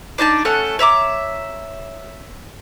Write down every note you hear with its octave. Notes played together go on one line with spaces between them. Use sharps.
D4 D#4 D5 A5
A3 C#4 A4 F#5
C#5 E5 A#5 D6